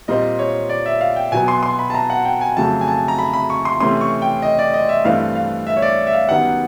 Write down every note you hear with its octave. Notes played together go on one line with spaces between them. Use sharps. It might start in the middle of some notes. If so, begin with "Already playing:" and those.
A#2 G3 C4 D#5
C#5
D5
E5
F5
G5
B2 F#3 B3 G#5
C6
C6
B5
A5
A#5
F#5
G5
G#5
F2 C#3 F#3 A3 A5
G#5
A5
A#5
B5
B5
C#6
C6
C3 E3 A3 C#4 C6
C#6
G5
D#5
D5
D#5
E5
G2 E3 A3 C4 F5
F5
E5
C#5
D5
E5
F5
F#2 D#3 G3 B3 F#5